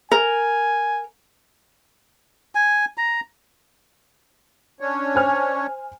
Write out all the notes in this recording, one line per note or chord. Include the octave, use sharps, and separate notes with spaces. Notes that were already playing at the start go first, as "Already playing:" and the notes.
A#4 G#5
G#5
A#5
C#4 D4 C#5
C5 G#5 F6